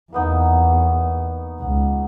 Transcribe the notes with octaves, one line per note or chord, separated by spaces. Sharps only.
E2 A#3 B3 D#4
C#6
C#2 F#5